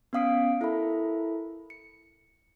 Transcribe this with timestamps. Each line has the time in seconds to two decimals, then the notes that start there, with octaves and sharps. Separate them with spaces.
0.13 B3 C#4 F5 D#6 C7 D7
0.61 E4 A4 A#4 E5 B5
1.70 C#7